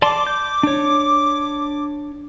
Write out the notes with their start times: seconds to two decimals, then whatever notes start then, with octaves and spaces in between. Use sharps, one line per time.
0.02 D5 A5 C6 D6
0.27 G6
0.63 D4 C#5